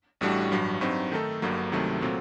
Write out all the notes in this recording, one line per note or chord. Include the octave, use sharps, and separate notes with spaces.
A1 A2 G3 D4 F#4
A1 G2 F#3
G2 F#3 C4 D#4
D#3 A3 D#4 A4
G1 G2 D3 F#3 A#3
C2 C3 D#3 F#3 A3
A#2 F#3 A3 C4